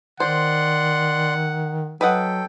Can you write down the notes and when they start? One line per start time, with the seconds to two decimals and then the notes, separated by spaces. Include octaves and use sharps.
0.20 D#3 C5 D5 F#5 C6
2.01 F#3 A4 B4 D#5 F#5 G5